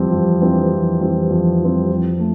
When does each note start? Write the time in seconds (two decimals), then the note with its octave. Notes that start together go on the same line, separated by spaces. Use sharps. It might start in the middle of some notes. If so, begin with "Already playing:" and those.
Already playing: F2 E3 G3 C4
0.12 F2
0.42 E3 G3 C4
0.72 F2
1.01 E3 G3 C4
1.30 F2
1.60 E3 G3 C4
1.90 F2
2.19 A3